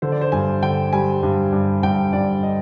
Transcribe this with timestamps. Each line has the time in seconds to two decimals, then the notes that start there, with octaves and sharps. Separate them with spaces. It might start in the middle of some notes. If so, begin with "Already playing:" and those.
0.02 D3 C5
0.12 D5
0.21 C5
0.32 G2 G#5
0.63 D3 G5
0.93 G3 G#5
1.23 G2
1.53 G2
1.83 G2 G5
2.13 G2 D5
2.43 D#5